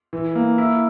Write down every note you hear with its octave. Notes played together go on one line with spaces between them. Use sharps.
E3
A#3
E4